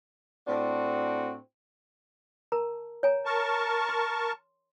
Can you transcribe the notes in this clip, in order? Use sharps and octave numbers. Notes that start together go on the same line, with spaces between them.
A2 C4 D4 F#4
A#4 A5 A#5
C#5 G#5 A#5
A#4 A5 C#6
C6